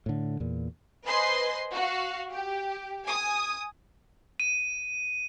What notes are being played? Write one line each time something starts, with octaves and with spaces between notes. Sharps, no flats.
A2 D3
E2 A#2
B4 C5 D#5 G#5 C6
F#4 F5
G4
G#5 D#6
D#7